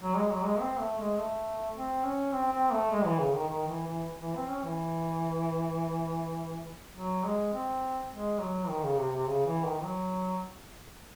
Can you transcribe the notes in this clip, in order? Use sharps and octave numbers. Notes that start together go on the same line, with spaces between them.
F#3
G#3
F#3
G#3
C4
A3
G#3
A3
C4
C#4
C4
C4
A3
G#3
E3
C#3
D#3
D#3
E3
E3
E3
C4
C#4
E3
F#3
G#3
C4
G#3
F#3
D#3
C#3
C3
C3
C#3
E3
D#3
F#3